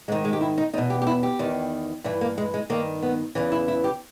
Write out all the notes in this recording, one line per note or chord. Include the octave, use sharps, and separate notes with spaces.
G#2 D#3 G#3
G#3
G4
E4
D#4
E2 B2 D#4
G4
G4
E4
G4
E2 D#3
G2 E3 E4
A#3
G#3
G#3
G2 D#3 A#3
B3
E2 C#3 E3
E4
E4
G4